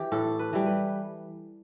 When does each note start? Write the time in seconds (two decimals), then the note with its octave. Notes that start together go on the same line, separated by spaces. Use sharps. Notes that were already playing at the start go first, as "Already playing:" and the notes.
Already playing: E3 G4
0.12 A2 A4
0.39 B4
0.53 E3 G3
0.66 B4